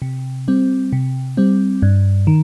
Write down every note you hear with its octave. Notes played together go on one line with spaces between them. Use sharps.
C3
G3 C4
C3
G3 C4
G2
D#3